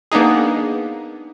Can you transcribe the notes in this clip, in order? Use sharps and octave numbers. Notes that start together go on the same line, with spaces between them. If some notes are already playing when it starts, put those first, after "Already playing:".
A#3 B3 D4 D#4 G#4